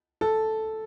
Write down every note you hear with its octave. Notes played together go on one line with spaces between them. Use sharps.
A4